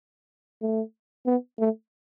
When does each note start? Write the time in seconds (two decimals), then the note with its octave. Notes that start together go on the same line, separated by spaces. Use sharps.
0.62 A3
1.26 B3
1.59 A3